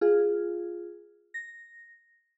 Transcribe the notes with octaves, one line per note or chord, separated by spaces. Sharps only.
F4 G#4
A#6